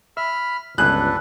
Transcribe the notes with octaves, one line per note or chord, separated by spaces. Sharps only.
E5 B5 F6
G1 C#2 D4 G#4 A4 B4 A5 F#6